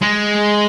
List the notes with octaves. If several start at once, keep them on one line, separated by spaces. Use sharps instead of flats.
G#3